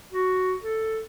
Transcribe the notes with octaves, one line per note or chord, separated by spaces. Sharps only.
F#4
A4